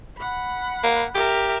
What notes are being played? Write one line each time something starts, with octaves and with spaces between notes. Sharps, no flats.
F#5 B5
A#3
G4 A#4 E5